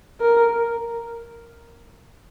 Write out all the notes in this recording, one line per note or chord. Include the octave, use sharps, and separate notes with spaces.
A#4